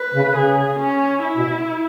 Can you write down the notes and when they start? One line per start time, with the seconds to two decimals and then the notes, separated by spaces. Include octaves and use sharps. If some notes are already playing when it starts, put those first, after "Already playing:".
Already playing: B4
0.14 C#3
0.36 C#3 G#4
0.80 C#4
1.23 E4
1.36 B2